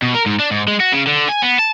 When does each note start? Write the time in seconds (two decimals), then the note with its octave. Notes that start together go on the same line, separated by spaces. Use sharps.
0.02 B2
0.14 A#4
0.26 G#2
0.39 D4
0.51 G#2
0.68 G#3
0.80 F#4
0.93 C#3
1.07 D3
1.29 G#5
1.42 B3
1.59 A5